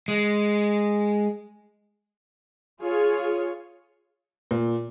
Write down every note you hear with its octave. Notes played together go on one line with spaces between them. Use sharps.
G#3
F4 G#4 C#5
A#2